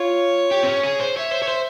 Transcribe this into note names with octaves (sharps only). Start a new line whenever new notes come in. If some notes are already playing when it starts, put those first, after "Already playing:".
Already playing: F4 C#5
G4
C4
C#4
G#4
C5
C#5 E5
C5
C#5
C5